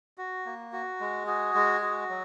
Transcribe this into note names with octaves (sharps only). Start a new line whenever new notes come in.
F#4
A#3
F#4
G#3
F#4 G#4
G#3
F#4
F#3